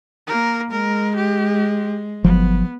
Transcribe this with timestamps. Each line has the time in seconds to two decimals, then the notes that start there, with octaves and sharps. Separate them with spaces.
0.27 A#3 A#4
0.72 G#3 A#4
1.16 G4
2.24 G1 F3 F#3 B3